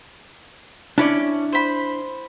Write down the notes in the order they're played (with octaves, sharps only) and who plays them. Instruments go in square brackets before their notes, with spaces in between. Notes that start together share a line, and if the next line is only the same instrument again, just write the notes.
[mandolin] C#4 [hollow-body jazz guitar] D4 E4 D5
[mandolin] C5 B5